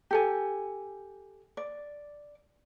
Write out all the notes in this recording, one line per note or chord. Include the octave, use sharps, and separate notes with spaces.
G4 A4 G#5
D5